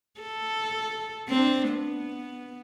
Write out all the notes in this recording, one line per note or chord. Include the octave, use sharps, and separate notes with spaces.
A4
C4 D4
B3